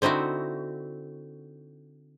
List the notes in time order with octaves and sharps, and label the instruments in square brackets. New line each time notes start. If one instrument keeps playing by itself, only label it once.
[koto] D3 C4 D#4 E4 F#4